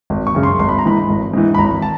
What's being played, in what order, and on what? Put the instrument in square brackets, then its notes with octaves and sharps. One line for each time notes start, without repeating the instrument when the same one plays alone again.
[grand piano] G#1
C#6
F#2 C#3
C6
G#1 C6
B5
A#5
G#2 E3 B5
G#1
G#2 E3
B5
G#1 A#5
A5